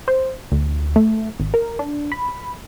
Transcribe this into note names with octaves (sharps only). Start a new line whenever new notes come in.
C5
D2
A3
G#1
A#4
D4
B5